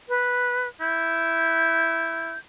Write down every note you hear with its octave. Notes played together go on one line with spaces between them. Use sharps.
B4
E4 G6